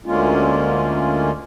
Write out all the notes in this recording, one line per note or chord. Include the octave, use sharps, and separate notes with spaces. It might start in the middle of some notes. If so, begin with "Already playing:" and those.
D2 D3 G#3 A#3 C#4 F4